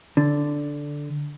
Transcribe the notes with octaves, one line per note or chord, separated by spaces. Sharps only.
D3